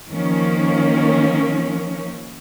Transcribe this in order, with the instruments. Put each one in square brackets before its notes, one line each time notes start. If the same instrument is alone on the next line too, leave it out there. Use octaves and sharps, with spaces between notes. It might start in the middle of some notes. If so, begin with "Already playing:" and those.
[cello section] D#3 F3 A#3 C#4